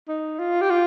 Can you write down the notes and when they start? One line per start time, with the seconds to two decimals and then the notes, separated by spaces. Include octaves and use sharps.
0.08 D#4
0.39 F4
0.61 G4
0.70 F4